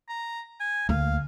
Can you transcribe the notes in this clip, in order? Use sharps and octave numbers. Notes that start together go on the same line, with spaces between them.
A#5
G#5
D2 A#3 F5